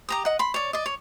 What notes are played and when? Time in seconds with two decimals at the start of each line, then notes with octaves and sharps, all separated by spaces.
0.09 G4 A#5 D#6
0.25 D#5 F#5
0.39 B5 C6
0.54 C#5 D5
0.73 D5 D#5
0.86 C#5